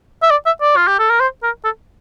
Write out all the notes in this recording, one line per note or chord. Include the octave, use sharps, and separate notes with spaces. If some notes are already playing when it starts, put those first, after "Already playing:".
E5
D5
E5
D5
F4
G4
A4
A#4
C5
A#4
A4